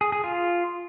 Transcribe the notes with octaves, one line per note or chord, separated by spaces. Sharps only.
G#4
G#4
F4